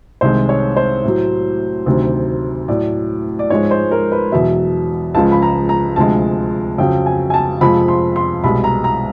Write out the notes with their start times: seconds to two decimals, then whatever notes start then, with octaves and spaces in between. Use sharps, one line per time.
0.21 C2 C3 D#3 G#3 C5
0.49 C#5
0.77 C5
1.04 A2 F#3
1.86 D2 C3 D#3 F#3
2.68 A2 F#3 D5
3.39 D5
3.50 G#2 F3 G#3 C#5
3.71 C5
3.91 A#4
4.12 B4
4.32 E2 B2 F#3 E5
5.14 C#2 C#3 F3 G#3 A5
5.32 B5
5.42 A#5
5.69 A#5
5.96 D2 C3 F3 G#3 A5
6.78 F2 C#3 F#3 G5
7.06 G#5
7.30 G#5
7.34 A5
7.61 F2 C3 F3 G#3 B5
7.88 C6
8.16 C6
8.44 C2 B2 G#3 B5
8.64 A#5
8.84 A#5